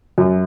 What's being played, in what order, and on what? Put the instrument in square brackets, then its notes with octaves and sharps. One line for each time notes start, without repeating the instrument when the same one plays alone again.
[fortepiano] F#2